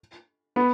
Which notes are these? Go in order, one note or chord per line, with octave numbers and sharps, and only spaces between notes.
B3